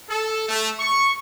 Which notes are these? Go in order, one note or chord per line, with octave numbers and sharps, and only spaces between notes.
A4
A3
C#6